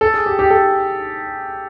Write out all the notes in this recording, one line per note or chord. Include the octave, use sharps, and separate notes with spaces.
A4
G#4
G4
G4
A4